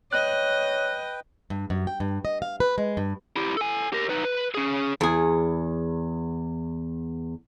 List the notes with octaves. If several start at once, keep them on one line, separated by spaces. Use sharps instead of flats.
B4 C#5 D#5 G5 F#6
G2
F#2
G5
G2
D#5
F5
B4
G#3
G2
E4 G4
A4 G#5
G4 A#4
D#4 B4
B4
C#4 G#4
E2 G#4